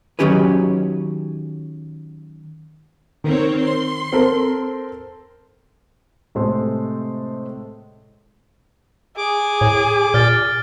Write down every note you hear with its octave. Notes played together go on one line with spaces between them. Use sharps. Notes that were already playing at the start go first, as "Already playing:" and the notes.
D#3 F#3 C#4 G4 G#4 B4
D#3 C4 A#4 C#5
C6
C4 A4 A#4
A2 C3 G#3 A4 C5 C6
G#4 D6
A2
A#2 F6 A6